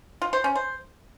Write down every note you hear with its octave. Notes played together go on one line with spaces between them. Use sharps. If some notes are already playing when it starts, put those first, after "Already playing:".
F4
C5
C#4
C5